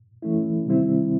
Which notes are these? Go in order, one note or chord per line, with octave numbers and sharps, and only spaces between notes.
E3 A3 C#4 E4
C3 D#3 G3 C4 E4